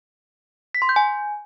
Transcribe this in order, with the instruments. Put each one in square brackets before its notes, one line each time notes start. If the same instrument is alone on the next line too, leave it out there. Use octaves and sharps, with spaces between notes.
[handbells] B6
C6
G6
G#5